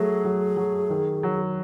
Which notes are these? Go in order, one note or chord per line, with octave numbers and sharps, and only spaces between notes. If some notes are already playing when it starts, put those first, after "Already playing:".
Already playing: F#3 A3 G#4
F#3
F#3
D#3
F#3